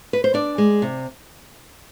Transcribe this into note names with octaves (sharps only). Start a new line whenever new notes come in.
B4
C5
D4 D5
G#3
C3